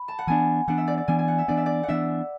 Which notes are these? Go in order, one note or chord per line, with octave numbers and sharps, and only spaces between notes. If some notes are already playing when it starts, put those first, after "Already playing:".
Already playing: B5
A5
F#5
E3 B3 D4 G#5
E3 B3 D4 F#5
E5
D5
D5
E3 B3 D4 G#5
G#5
F#5
E5
E3 B3 D4 D5
E5
D5
F#5
E3 B3 D4 E5